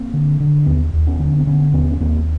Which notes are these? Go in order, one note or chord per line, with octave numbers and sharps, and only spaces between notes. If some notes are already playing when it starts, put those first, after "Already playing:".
Already playing: A#3 C4
D3
D3
D#2 B3 C#4
D#2
B3 C#4
D3
B3 C#4
C4
D3 B3 C#4
D#2 B3 C#4
C#4
D#2 A#3 C4